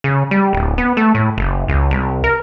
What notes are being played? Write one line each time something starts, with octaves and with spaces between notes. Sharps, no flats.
C#3
G3
D1
B3
A3
A2
F#1
C#2
C2
A#4